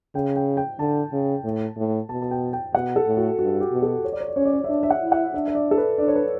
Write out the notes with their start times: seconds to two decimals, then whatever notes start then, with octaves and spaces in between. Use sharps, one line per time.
0.15 C#3 G5
0.36 G5
0.57 G5
0.79 D3 A5
1.12 C#3
1.44 A2
1.77 A2
2.09 B2 A5
2.22 A5
2.31 G5
2.53 G5
2.74 B2 F#5
2.96 A4
3.06 A2
3.17 F#4
3.39 G2 F#4
3.61 G4
3.72 B2
3.82 A4
4.05 C#5
4.13 D5
4.20 C#5
4.28 D5
4.36 C#4 C#5
4.45 D5
4.53 C#5
4.64 E5
4.69 D4 D5
4.83 E5
4.90 F#5
5.02 E4
5.12 F#5
5.34 D4 E5
5.48 E5
5.55 D5
5.71 A4
5.78 B4
5.98 D4 D5
6.08 C#5
6.16 B4